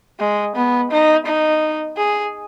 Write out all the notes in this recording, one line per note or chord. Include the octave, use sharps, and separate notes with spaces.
G#3
B3
D#4
D#4
G#4